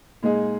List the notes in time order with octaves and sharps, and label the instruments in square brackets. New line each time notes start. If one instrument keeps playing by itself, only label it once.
[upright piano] A#2 G#3 D#4 G#4